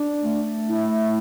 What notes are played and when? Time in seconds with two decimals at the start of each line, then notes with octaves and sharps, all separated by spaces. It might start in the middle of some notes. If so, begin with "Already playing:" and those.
Already playing: D4
0.21 A3
0.69 E4